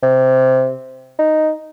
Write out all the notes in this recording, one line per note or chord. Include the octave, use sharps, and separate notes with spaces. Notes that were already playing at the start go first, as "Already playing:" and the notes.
C3
D#4